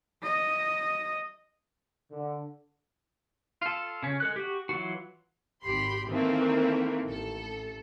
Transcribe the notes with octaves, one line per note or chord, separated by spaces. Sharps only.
D#5
D3
F4 A4
C#3 C#4
G#3 A4 F#6
F#4 G4
E3 F#3 F4 F#4
G#1 G4 B5 C6
D#3 E3 A3 A#3 C4
A1 A4